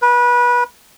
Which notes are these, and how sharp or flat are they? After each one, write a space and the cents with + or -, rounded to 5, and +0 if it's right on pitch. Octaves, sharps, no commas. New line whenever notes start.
B4 -25